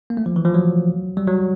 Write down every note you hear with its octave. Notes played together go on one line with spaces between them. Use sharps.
A#3
A3
F3
E3
F3
F#3
G3
F#3